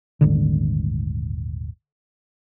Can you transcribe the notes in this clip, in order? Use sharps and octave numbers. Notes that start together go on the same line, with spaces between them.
D#1 G#1 D3